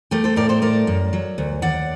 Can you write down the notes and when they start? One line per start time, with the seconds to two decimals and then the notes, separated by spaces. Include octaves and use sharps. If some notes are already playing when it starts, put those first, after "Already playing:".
0.11 A3 G4 A#4
0.24 A4 C5
0.36 A2 A#4 D5
0.49 A4 C5
0.62 A3 A#4 D5
0.87 F#2
1.13 F#3
1.38 D2
1.62 D#2 D5 F#5